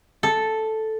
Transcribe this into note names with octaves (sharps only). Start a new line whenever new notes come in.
A4